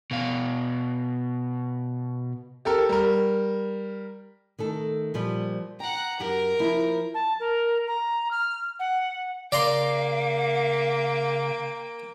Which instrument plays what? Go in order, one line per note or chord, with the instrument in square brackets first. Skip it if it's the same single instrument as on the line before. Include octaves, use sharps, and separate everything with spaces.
[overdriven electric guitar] B2 F5
[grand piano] G4 A4 A#4
G3 A#4
[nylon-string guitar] D#3 A3 A4
A#2 F3 G3
[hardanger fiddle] F#5 A#5 [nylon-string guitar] G5
[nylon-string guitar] F#2 G4 F#5 [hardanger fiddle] A#4
[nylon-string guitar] F3 A#3 E4
[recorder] A5
A#4
A#5
F6
F#5
[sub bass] C#3 [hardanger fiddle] A#3 G5 [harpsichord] D5 A#5 C6 [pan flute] F5